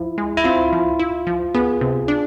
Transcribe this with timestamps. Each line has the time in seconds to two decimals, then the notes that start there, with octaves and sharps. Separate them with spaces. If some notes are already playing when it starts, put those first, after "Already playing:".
Already playing: F3 E4
0.18 G#3
0.37 E4
0.44 C4 F4
0.73 F3
0.99 E4
1.27 F3
1.55 B3 G#4
1.81 C3
2.08 D4